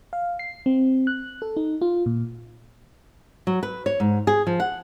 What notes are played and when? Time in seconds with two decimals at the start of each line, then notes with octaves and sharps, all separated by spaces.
0.13 F5
0.39 C7
0.66 C4
1.07 F#6
1.42 A4
1.57 D#4
1.81 F4
2.06 A#2
3.47 F#3
3.63 B4
3.86 C#5
4.00 G#2
4.27 G#4
4.47 F3
4.60 F#5